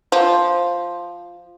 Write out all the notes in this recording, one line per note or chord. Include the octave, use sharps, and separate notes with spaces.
F3